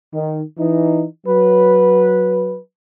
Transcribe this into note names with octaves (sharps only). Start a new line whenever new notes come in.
D#3
E3 D#4
F#3 B4